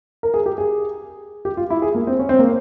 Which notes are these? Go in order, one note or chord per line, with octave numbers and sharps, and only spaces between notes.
A#4
G#4
G4
G#4
G4
F4
E4
G#4
A#3
C4
C#4
C4
A#3